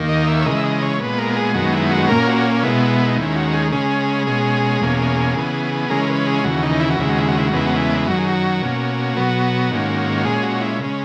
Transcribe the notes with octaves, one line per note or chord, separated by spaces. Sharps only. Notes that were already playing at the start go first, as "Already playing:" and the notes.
Already playing: D#2 D#3 A#3
D#5
E5
C#5
C#3 E3 G#3 D#5
E5
D#5
C#5
A#2 G#3 B3 B4
A#4
G#4
F#2 D#3 G#3 B3 F#4
E4
F#4
A#2 A#3 C#4 A#4
F#4
B2 G#3 B3 E4
D#4
D#2 D#3 G#3 C#4 E4
F#4
G#4
C#3 G#3 C#4 G#4
B2 G#3 C#4
E2 B2 A#3 C#4
C#3 E3 B3
C#3 E3 G#3 C#4 A#4
B4
G#4
D#2 C#3 E3 F#4
D#4
E4
F#4
D#2 C#3 G#3 E4
F#4
E4
F#4
E4
F#4
E2 C#3 G#3 B3 E4
F#4
E4
F#2 D#3 F#3 F#4
G#4
F#4
B2 A#3 C#4
B2 F#3 B3
G#2 D#3 A#3 C#4
F#4
A#2 G#3 C#4 G#4
F#4
E4
C#3 G#3 C#4